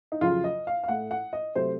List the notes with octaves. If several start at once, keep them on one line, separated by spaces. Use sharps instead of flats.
D#4
F2 C#3 F#3 F4
D#5
F5
F5
A2 A3 F#5
F#5
D#5
C3 F#3 A3 C5